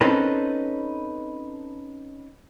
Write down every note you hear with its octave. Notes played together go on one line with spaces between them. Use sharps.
C4 C#4 D#4 A4 B4